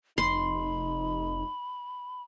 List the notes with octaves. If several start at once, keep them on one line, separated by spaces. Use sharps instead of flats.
F1 D#4 B5 C6